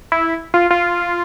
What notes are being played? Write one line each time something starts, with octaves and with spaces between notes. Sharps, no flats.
E4
F4
F4